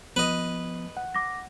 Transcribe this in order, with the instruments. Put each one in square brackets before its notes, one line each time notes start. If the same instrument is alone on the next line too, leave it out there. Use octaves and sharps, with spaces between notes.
[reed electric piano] F3 B3 [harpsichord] B4 D#5
[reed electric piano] F#5
[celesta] D6 A#6